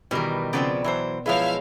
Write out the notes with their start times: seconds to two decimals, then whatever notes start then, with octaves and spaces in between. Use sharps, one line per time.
0.11 B2 D#3 E3 G3 A#4
0.53 C#3 F3 B3 C4 D5 G5
0.84 E3 F#3 C5
1.26 F3 F#3 G#3 E4 B4 E5 F5 F6